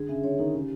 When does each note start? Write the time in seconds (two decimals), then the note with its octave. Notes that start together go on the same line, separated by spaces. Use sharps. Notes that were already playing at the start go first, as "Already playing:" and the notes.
Already playing: D3 G#4
0.09 C#3 E5
0.23 D3 C#5
0.39 D#3 D#4
0.54 C#3 G4